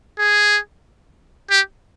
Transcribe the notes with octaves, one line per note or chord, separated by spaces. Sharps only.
G#4
G4